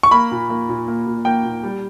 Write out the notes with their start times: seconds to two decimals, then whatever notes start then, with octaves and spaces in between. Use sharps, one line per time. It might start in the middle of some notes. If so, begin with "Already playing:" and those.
0.03 C#6
0.11 A#3 B5
0.31 A#2
0.50 A#3
0.69 A#2
0.88 A#3
1.06 A#2
1.25 A#3 G5
1.44 A#2
1.63 G3